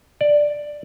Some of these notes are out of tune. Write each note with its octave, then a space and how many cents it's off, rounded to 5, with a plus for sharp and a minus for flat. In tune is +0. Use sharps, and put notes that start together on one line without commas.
D5 +5